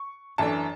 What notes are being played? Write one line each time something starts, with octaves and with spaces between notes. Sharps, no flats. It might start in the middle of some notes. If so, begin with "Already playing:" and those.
Already playing: C#6
F#2 E3 A3 D4 A5